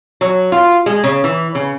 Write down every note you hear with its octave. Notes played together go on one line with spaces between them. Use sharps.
F#3
F4
G#3
C#3
E3
C#3